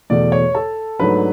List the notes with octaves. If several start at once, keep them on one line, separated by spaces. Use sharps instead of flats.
E2 B2 A3 D5
C#5
A4 A5
G#2 F#3 A3 D4 B4 B5